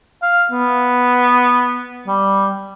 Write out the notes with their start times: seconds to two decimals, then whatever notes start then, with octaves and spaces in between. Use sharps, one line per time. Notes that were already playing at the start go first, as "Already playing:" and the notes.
0.22 F5
0.52 B3
2.07 G3